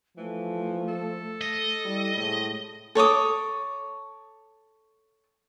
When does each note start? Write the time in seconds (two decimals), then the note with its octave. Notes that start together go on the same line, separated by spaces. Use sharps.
0.17 E3 F3 A3
0.88 A4
1.41 D#5
1.85 G3 E4
2.17 A2 C3 G#3
2.95 A4 C#5 D6 D#6